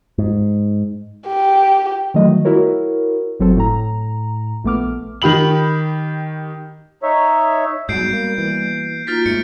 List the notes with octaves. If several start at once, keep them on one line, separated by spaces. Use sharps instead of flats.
G#2
G4
D#3 E3 F#3 G3 A3 D#5
E4 F#4 A#4 C#5
G1 F#3 C4 A4
A2 A#5
A#1 A3 B3 D6 F6
D#3 G4 B5 F#7
D#4 C#5 E5
G#2 F#3 G3 B3 F#4 G6 C7 D7
A#3
E3 A#3
A#3 D#4 F4 F#4 F6 A6 B6
G#2 A3 C#7